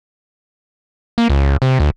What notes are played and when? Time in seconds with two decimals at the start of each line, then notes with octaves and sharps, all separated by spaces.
1.18 A#3
1.30 C#2
1.62 C3
1.80 D2